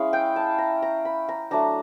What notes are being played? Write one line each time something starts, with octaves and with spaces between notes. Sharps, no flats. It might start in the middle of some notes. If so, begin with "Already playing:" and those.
Already playing: G#3 C#4 E4 F5
G5
A5
A#5
A#5
B5
A#5
F#3 A3 D4 A#5